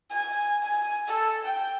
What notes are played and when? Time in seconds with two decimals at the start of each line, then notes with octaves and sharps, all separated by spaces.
0.10 G#5
0.63 G#5
1.08 A4
1.45 G5